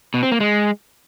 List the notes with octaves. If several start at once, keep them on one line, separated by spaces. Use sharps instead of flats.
B2
C4
A#3
G#3